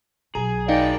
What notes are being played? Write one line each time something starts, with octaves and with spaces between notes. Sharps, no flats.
B1 G#4 A#5
D#4 G#4 A#4 D5 D#5 F5 G5